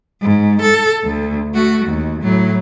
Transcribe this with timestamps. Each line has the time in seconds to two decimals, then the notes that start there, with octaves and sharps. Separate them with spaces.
0.22 G#2
0.62 A4
1.04 D2
1.54 A3 F#4
1.85 D#2
2.22 A2 F#3